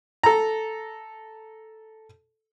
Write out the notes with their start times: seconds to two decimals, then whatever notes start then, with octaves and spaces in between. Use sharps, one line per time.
0.23 A4 A#5